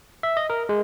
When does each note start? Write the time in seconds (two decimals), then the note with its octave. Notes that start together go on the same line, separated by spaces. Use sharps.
0.23 E5
0.37 D#5
0.50 A#4
0.69 G#3